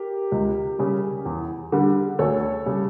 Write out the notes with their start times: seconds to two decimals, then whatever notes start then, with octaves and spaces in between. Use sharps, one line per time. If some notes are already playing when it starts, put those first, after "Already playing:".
Already playing: G4 A#4
0.32 C#2
0.79 C#3 G3
1.25 E2
1.72 D3 G3
2.19 D2 A4 C#5
2.66 C#3 G3